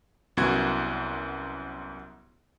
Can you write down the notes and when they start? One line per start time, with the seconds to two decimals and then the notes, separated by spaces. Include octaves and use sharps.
0.37 C2 F#2 B3 F#4 G#6